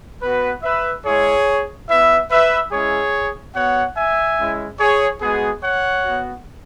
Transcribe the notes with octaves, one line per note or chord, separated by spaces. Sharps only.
B3 F#4 B4
B4 E5
G#3 E4 G#4 C#5
B3 E4 B4 E5
B4 E5
G#3 C#4 E4 G#4 C#5
B3 F#4 C#5 F#5
E5 G#5
G#3 C#4 E4
G#4 C#5
G#3 B3 F#4 G#4
C#5 F#5
B3 F#4